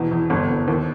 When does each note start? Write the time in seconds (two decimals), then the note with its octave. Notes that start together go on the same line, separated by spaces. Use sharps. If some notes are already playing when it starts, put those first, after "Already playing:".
Already playing: E2 B2
0.11 E2
0.30 G1
0.49 G1
0.68 D#2